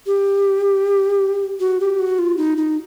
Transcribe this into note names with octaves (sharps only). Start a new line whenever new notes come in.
G4
F#4
G4
F#4
F4
D#4
D#4